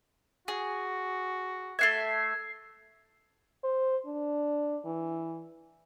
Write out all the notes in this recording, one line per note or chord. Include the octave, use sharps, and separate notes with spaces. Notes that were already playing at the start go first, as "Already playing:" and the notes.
F#4 G#4
A3 B3 E5 G#6 C7
C5
D4
E3